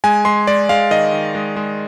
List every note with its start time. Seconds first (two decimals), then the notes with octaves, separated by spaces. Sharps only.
0.04 G#3 G#5
0.25 G#3 C6
0.47 G#3 D5
0.69 G#3 F5
0.91 D#3 D#5
1.13 D#3
1.35 G#3
1.57 G#3